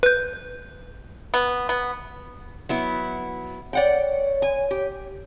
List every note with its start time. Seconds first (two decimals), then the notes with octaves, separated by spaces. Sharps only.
0.03 B4 G6
1.34 B3
1.69 B3
2.69 F#3 B3 E4
3.73 C#5 D5 F#5 G5
4.42 G#5
4.71 G4